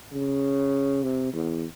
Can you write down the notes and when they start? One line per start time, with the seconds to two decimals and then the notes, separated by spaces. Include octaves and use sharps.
0.13 C#3
1.03 C3
1.33 E2